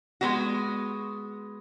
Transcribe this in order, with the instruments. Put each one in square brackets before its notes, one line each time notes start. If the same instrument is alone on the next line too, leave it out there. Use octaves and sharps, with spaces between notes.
[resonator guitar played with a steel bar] G#3 B3 F#4